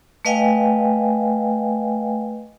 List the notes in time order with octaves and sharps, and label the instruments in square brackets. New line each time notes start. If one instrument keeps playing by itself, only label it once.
[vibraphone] A3 B4 D#5 F5 G5 G#5